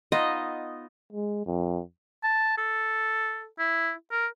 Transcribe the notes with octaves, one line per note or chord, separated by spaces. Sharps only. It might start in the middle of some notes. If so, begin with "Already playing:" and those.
B3 D#4 F4 D#5
G#3
F2
A5
A4
E4
A#4